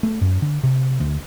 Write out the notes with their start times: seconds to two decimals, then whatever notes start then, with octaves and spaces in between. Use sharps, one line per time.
0.03 A3
0.21 F#2
0.42 D3
0.64 C3
1.00 D2